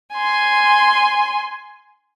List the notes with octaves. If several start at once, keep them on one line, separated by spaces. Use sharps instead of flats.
G#5 C6